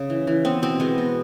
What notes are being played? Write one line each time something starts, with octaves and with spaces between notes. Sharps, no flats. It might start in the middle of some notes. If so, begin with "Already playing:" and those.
Already playing: C#3 C#4
E3
E3
B3 C4
B2 C4
G#3 B3
B2